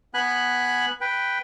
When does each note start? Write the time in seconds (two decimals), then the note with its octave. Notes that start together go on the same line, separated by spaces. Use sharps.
0.14 B3 G#5 B5 F#6
1.01 B4 G5